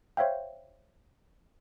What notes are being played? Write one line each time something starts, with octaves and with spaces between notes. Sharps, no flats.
C5 C#5 E5 F5 G5